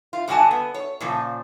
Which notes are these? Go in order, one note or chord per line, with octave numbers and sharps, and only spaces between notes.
F4
G2 D3 F#4 F#5 G#5 A5
B3
C#5
A#2 C#3 F3